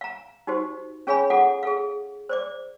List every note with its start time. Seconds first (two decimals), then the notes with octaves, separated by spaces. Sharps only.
0.01 F5 A#5
0.47 D#4 F#4 G4 C5
1.07 C#4 G#4 C#5 F5 G#5 B5
1.30 F4 G#4 A4 F5 F#5 D6
1.63 G#4 A4 F5
2.29 C5 D5 D6